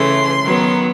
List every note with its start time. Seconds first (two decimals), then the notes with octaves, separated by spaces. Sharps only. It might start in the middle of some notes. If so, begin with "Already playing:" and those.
Already playing: C#3 E3 A3 C6
0.41 D#3 F#3 B3